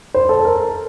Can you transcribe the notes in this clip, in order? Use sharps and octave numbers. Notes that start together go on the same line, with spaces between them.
C5
A4
A#4